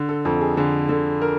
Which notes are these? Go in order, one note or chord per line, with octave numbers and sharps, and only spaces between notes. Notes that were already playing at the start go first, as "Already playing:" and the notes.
Already playing: D3
A4
F2 A4
G#4
D3 G#4
D3 A4
A#4